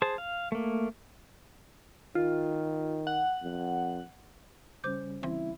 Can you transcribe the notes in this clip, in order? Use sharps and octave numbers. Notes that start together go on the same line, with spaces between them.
G#4 C5 A5
F5
A3 A#3
D#3 F4
F#5
F2
C#3 G3 C#4 C5 D6 G6
C2 E3 C4 E4